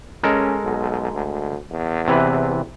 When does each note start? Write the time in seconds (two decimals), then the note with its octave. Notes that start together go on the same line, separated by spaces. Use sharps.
0.23 G#3 C#4 A4 A#4
0.63 B1
1.12 D2
1.71 E2
2.08 C3 E3 B4